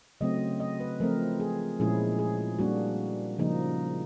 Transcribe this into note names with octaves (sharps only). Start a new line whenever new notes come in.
C#3 F#3 A3 C4 D#5
D#5
B4
F3 A3 C4 A#4
G#4
A#2 F3 G#3 C#4 E4 G#4
G#4
G3 A#3 D4 F#4
C#3 F3 A#3 D#4